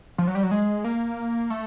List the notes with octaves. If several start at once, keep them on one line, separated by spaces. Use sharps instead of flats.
F3
F#3
G3
F#3
G#3
A#3
A3